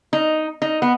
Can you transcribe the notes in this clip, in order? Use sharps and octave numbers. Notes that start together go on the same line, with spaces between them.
D#4
D#4
B3